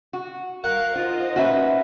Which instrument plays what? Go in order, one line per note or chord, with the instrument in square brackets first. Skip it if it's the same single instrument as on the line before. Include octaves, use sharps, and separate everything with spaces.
[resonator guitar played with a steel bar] F#4
[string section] A#4 F5 [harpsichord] F#5
[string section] D#4 C5 D#5 [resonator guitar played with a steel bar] F4
[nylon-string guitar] C#4 E5 [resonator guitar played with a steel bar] F#4 B4